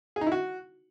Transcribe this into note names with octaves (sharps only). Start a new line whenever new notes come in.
G#4
D#4
E4
F#4